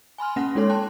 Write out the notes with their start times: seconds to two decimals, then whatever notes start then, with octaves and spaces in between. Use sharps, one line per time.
0.18 G#5 B5 C6 F6
0.36 A#3 C#4 F#5 A#6
0.55 G#3 D#4 A4 C#5 C6
0.69 G5 A5 C6 F#6